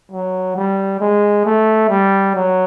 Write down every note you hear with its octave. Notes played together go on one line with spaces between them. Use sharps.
F#3
G3
G#3
A3
G3
F#3